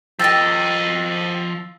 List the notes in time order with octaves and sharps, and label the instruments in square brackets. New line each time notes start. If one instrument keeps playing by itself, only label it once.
[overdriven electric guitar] F3 D#5 [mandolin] G4 A#4 G5 [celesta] E6 A6 A#6